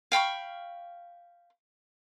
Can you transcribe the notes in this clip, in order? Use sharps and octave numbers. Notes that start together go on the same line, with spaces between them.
F5 G5 B5 C#6